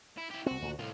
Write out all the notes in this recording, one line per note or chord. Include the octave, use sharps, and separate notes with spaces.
E4
E4 G4
C2 C4 F#4
D2 A#2
C2 A2 F4